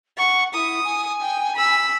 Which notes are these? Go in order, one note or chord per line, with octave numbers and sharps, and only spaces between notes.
F#5 C#6
E4 D#6
G#5
G5
B5 E6